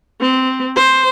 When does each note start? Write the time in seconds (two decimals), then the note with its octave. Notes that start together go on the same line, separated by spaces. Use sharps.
0.21 C4
0.76 C5